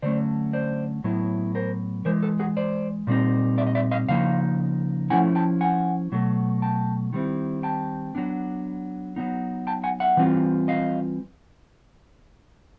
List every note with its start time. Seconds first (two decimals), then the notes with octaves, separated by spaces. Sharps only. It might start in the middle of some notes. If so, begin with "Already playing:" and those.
0.02 D3 F#3 A3 C#4 C5 D5
0.53 C5 D5
1.04 A2 F#3 B3 E4
1.55 A#4 C5
2.05 E3 G#3 A#4 C5
2.23 A4 B4
2.39 F#4 G#4
2.57 C5 D5
3.07 A#2 G3 C4 D#4
3.58 D5 E5
3.67 D#5
3.75 D5 E5
3.91 D#5 F5
4.08 C#3 F3 A#3 D#4 F5
5.10 F3 A3 C#4 E4 F#5 G#5
5.35 G5 A5
5.61 F#5 G#5
6.12 B2 F#3 A3
6.62 G5 A5
7.13 D#3 G3 C4 E4
7.63 G5 A5
8.15 F#3 B3 D4
9.16 F#3 B3 D#4
9.67 G5 A5
9.84 F#5 G#5
10.00 E5 F#5
10.17 E3 G3 C4 F4
10.68 D#5 F5